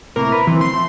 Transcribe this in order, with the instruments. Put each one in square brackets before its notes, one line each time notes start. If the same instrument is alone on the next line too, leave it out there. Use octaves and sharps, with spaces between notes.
[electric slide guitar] A2 C3 A#3 [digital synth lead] A#4
[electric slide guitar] B4
[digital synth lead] E3 [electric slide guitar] C4
[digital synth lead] C6
[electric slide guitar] F3 A3 C4